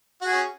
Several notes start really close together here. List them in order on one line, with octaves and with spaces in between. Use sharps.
F#4 G#4 C#4